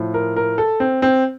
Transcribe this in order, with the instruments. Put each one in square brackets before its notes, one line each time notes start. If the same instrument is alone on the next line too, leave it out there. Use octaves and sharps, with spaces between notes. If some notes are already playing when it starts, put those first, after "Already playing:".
Already playing: [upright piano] A2 F3
A#4
A#4
A4
C4
C4